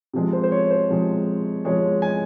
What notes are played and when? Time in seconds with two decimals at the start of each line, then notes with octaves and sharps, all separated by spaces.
0.13 C3 F3 G#3
0.33 C5
0.43 C5
0.52 C#5
0.71 C5
0.90 C3 F3 G#3
1.65 C3 F3 G#3 C#5
2.02 G#5